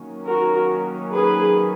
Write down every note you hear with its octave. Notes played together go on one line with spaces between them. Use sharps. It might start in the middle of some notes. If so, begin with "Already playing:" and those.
Already playing: D#3 F#3 A#3 C#4
F#4 A#4
G#4 B4